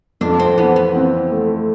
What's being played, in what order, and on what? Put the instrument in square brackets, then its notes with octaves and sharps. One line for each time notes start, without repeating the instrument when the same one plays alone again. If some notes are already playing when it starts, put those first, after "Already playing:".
[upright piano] F2 [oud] D4
[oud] C4
[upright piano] E3 [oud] B3
[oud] B3
[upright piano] C4
A3